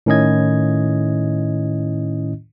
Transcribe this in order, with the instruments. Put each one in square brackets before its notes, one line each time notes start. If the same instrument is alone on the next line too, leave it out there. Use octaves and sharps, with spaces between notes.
[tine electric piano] A2 D#3 C#4 E4 D#5 G#6